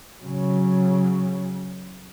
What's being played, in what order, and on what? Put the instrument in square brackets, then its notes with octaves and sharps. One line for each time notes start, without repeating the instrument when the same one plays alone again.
[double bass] C#3 F#3